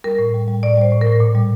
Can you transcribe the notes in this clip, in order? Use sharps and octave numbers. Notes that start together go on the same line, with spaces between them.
G3 A#4
A2
G3
G3
A2 D5
G3 C5
A2
A#4
A2
A#2
G3